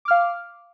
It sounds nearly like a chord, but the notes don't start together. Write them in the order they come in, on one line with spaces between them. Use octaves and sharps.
D6 F6 F5